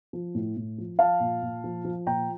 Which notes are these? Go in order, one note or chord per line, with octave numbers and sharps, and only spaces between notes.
F3
A2
A2
F3
F3 F5 A5
A#2
A#2
F3
F3
A#2 G5 A#5